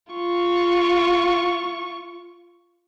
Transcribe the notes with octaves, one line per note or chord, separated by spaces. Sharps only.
F4 C#6